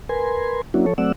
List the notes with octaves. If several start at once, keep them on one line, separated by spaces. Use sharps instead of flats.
A#4 B4 G#5 C6
F#3 A#3 C#4 D4 E4 F#4
F3 A4 C#5
F#3 A3 C4 D5 F#5 E6